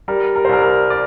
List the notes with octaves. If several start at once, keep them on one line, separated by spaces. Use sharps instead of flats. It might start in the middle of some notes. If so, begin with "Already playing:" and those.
G3 A#4
A#4
C5
C2 A#4
A#4
D5